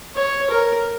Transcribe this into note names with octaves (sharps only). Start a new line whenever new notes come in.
C#5
A#4